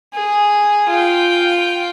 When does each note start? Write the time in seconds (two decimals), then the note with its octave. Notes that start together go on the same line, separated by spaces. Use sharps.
0.14 G#4
0.89 F4 G5